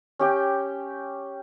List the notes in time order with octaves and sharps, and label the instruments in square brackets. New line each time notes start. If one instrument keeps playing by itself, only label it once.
[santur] C#4 G4 G5